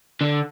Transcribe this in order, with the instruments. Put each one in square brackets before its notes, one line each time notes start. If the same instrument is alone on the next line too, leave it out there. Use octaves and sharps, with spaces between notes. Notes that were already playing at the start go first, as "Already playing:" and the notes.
[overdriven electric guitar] D3